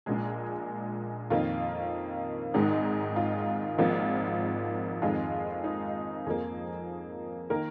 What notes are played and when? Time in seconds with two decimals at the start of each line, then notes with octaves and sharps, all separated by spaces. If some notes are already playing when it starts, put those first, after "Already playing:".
0.06 A#1 A#2 G#3 G#4
1.30 F2 D#3 A#3 F4
2.54 G#1 G#2 D#3 G#3 D#4
3.16 F4
3.78 G#1 G#2 F3 A#3 F4
5.02 F2 D#3 G#3 F4
5.64 D#4
6.26 F2 F3 A#3 G#4
7.50 D#3 A#3 A#4